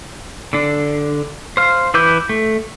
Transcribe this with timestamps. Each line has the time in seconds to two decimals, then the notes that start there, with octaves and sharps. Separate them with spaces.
0.53 D3 D4
1.57 C5 F5
1.94 E3 E4 B4 D6 G6
2.29 A3